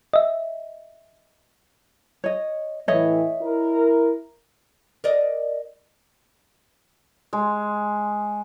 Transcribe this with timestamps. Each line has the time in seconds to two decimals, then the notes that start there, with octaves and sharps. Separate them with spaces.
0.14 D#5 E5
2.24 C#5 D#5
2.88 A2 E3 C#5 D#5 E5
3.42 E4 A#4
5.04 A#4 D5 D#5
7.33 G#3